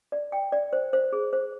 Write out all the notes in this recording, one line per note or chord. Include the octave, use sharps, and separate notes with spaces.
D5
G5
D5
C5
C5
G#4
C5